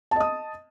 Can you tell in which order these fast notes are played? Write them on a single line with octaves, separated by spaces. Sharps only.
A5 D#5 D#6